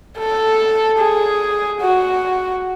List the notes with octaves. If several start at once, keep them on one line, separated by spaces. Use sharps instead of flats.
A4
G#4
F#4